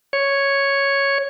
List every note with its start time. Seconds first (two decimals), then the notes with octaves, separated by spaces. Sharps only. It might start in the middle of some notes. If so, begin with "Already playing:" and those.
0.13 C#5